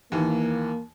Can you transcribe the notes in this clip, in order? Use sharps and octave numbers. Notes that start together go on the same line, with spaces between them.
D#2 E3 A#3